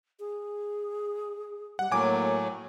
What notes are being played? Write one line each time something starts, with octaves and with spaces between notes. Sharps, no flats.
G#4
G3 F#5
A2 F#3 A#3 G#5 D6